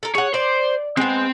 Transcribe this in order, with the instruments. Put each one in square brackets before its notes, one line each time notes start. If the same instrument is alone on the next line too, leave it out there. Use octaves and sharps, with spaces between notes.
[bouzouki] A4 A#4
[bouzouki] G#4 F#5 [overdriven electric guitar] C#5
[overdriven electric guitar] C5 [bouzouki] D5
[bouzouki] G#3 B3 [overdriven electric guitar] C4 G5